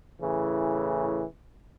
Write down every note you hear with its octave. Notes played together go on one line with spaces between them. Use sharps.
A2 C#3 E3